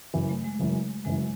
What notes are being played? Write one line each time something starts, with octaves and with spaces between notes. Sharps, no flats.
F#1 F#2 E3
A3
G#3
F#1 F#2 E3
F#1 F#2 E3 G#3